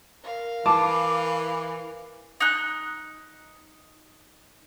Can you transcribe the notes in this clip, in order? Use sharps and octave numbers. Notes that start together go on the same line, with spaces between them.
A#4 F5
E3 A5 D6
D#4 F#6